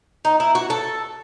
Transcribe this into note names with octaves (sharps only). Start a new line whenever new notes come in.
D#4
E4
F#4
A4